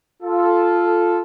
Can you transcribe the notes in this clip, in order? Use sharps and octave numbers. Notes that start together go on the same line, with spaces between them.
F4 A4